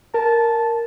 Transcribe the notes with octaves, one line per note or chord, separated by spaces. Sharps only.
A#4 A5